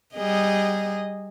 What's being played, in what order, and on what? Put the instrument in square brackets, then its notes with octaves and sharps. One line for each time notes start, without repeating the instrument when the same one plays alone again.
[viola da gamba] G3 G#4 D#5